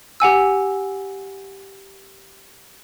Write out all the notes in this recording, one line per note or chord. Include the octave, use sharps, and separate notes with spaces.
G4 F#5 G#5 E6